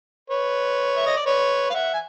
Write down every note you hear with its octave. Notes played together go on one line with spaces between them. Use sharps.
B4 C#5
E5
D#5
D5
B4 C#5
F5
E5 F#5
G#5